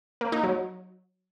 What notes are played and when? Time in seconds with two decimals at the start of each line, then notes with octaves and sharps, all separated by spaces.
0.21 A#3
0.32 D#4
0.43 F#3